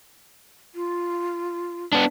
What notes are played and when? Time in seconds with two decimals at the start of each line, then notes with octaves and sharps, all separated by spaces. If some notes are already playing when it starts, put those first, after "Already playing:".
0.75 F4
1.93 B3 D4